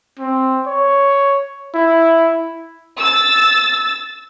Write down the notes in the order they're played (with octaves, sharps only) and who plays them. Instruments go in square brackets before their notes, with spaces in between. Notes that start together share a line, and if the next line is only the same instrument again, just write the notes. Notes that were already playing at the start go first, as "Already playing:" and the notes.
[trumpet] C4
C#5
E4
[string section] E6 A6